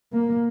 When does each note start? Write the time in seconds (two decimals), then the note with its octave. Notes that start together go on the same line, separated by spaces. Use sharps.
0.13 A#3